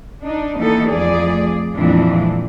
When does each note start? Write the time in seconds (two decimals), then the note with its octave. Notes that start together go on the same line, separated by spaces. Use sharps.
0.24 D4 D#4
0.57 D#3 E3 A#3 B3 D#4 A4
0.89 F2 A3 G#4 D5
1.73 F2 A#2 E3 G#3 C4 D4